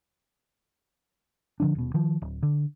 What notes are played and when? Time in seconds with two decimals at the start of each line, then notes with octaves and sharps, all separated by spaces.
1.60 D3 F3 D4
1.75 D#1 B2
1.94 D#3 F3
2.22 D1
2.43 D3